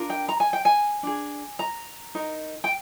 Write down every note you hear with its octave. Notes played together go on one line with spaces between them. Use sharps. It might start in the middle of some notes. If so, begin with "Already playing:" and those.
Already playing: D4 F4 A#4
G5
A#5
G#5
G5
G#5
D4 G#4
A#5
D#4 A#4
G5